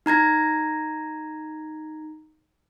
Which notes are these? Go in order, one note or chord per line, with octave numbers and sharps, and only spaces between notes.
D#4 A#5 G#6 A#6